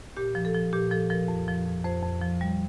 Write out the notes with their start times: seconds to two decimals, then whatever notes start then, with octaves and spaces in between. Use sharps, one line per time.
0.17 A#2 G4
0.35 F3
0.45 A4
0.54 F3
0.73 A#2 G4
0.91 F3 A4
1.10 F3 A#4
1.28 F2
1.48 F3
1.67 F2
1.85 F2 C5
2.03 F2
2.21 F3
2.41 G3